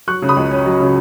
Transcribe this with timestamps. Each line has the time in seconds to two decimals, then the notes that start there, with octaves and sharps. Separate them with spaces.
0.07 F#3 C#6 F#6
0.22 C#3
0.29 B5 D#6
0.37 C#2
0.51 C#4
0.66 F#3
0.80 C#3